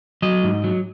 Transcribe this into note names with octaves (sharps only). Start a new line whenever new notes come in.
F#3 D#5
G#2
F#3